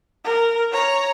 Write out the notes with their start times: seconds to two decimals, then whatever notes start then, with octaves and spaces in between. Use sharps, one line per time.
0.25 A#4
0.72 C#5 A#5